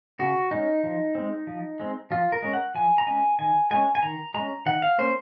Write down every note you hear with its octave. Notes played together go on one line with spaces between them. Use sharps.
C#3 F#4
G#3 C#4 D#4
F3
G#3 C4
F3
G#3 C4
F3 F4
A#4
G#3 C#4
F#5
F3 G#5
A#5
G#3 C#4 G#5
D#3 G#5
G#3 C#4 G#5
G#5
D#3 A#5
G#3 C#4 A#5
D#3 F#5
F5
A#3 C#4 C5